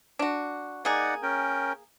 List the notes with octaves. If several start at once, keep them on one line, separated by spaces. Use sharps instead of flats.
D4 F#4
A#3 D#4 G#4 D5 F#5
C#4 A#4 G5